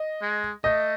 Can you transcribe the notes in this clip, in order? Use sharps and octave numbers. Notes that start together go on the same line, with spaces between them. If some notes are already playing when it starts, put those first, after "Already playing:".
Already playing: D#5
G#3
A3 D#5